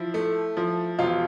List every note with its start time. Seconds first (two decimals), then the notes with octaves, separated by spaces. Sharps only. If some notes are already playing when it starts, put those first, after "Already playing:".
Already playing: F3 E4
0.14 A3
0.57 F3
0.99 E1 F4 F5